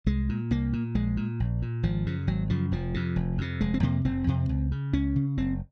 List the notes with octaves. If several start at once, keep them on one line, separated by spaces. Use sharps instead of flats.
C2 G#3
A#2
C2 A#3
A#2
A#1 G#3
A#2
A#1
A#2
G#1 F3
F#2 C#3
G#1 F#3
F#2 C#3 F3
F1 F3
F2 C3
F1
F2 C3
F1 G#3
C4
F2 C3 A#3
F1 C4
F2 C3
C#2
C#3
C#2 C#4
C#3
F#1 C4